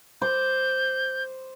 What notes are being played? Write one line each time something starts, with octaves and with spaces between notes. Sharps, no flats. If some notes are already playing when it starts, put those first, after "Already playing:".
C5 D6 G6